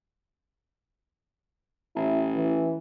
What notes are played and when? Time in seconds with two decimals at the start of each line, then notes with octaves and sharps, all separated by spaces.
1.96 A1 E4
2.35 E3